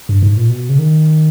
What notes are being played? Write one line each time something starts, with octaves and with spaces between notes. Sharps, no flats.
G2
G#2
A#2
B2
C#3
D#3